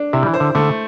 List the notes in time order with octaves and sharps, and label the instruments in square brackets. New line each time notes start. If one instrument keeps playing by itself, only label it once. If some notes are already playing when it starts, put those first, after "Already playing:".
Already playing: [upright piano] D4
[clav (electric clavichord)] C3 [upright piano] E4
[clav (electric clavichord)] G3
E3
[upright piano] C5
[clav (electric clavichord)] D3
[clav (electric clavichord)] D3 [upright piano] A3